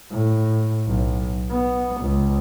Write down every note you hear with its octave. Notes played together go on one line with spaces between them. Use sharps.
A2
B1
B3
C#2